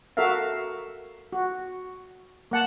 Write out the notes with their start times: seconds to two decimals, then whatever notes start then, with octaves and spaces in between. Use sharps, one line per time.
0.17 F#4 A4 A#4 E5 F5
1.33 F#4
2.51 A#3 F#5 A5